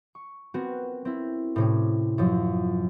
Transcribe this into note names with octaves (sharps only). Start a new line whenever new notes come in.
C#6
B3 C4 F#4 A#4
C4 E4
A2 C3 C#4
F#2 F3 F#3